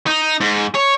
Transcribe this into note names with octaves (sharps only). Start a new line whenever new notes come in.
D#4
G#2
C#5